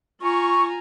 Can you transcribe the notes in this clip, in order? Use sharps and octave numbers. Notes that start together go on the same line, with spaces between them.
F4 G#5 A#5 C#6